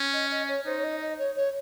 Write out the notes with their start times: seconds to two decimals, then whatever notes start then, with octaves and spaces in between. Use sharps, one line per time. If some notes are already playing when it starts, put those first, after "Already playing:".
Already playing: C#4
0.13 D#5
0.31 D#5
0.48 C#5
0.66 D#4 C5
0.77 C#5
0.84 D#5
1.01 D#5
1.19 C#5
1.36 C#5